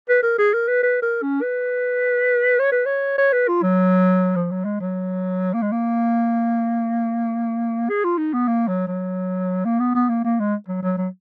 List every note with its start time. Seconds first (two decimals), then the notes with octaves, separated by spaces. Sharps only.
0.09 B4
0.23 A#4
0.39 G#4
0.54 A#4
0.68 B4
0.83 B4
1.02 A#4
1.22 C#4
1.42 B4
2.59 C#5
2.72 B4
2.86 C#5
3.18 C#5
3.33 B4
3.48 F4
3.62 F#3
4.36 F3
4.51 F#3
4.65 G#3
4.80 F#3
5.54 A#3
5.62 G#3
5.72 A#3
7.89 G#4
8.04 F4
8.18 D#4
8.34 B3
8.48 A#3
8.68 F#3
8.87 F#3
9.65 A#3
9.80 B3
9.95 B3
10.09 A#3
10.24 A#3
10.40 G#3
10.68 F#3
10.83 F#3
10.98 F#3